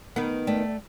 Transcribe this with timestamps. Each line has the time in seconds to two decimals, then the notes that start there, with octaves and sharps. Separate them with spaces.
0.16 D#3 B3
0.47 A3 D5 G5